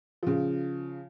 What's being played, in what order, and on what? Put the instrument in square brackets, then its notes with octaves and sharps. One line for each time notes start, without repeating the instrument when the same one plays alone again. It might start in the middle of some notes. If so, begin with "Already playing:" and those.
[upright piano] C#3 F3